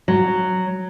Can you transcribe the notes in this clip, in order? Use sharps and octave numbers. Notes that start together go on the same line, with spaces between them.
F#3